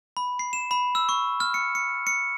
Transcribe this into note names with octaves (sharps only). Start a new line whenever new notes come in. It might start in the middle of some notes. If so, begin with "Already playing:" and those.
B5
C7
E7
B5
E6
C#6
F6
C#7
C#7
C#7